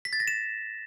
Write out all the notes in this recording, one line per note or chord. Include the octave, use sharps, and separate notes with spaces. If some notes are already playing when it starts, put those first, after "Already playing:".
B6
A6
A#6
E7